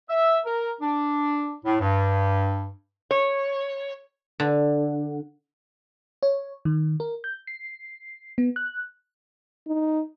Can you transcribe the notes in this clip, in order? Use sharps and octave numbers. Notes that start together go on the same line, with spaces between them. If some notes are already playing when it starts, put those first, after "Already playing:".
E5
A#4
D4
A2
G2
C#5
D3
C#5
D#3
A#4
G6
C7
B3
F#6
D#4